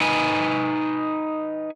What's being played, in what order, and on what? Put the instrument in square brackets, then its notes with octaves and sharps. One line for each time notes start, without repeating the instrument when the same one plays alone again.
[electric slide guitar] D#4 B4 G#5